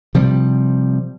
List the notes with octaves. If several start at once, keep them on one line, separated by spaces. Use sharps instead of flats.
C3 F3 G3